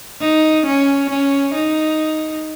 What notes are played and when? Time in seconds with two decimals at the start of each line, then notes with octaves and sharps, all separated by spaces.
0.20 D#4
0.65 C#4
1.09 C#4
1.54 D#4